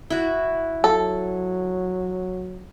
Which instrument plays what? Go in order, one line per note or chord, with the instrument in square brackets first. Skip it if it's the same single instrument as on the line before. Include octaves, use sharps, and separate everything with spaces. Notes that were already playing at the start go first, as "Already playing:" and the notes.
[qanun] E4 F#4
[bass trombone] F#3 [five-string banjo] A4